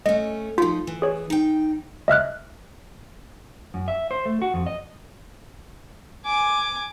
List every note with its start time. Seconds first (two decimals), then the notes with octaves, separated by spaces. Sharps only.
0.06 A3 C#4 D#5
0.58 F3 D#4 F4
0.87 E3
1.02 G#4 C#5
1.30 D#4 G5
2.08 D#5 E5 F6 F#6
3.74 F#2
3.88 E5
4.11 C5
4.25 A3
4.42 F#4
4.54 F2
4.66 D#5
6.25 G#5 D6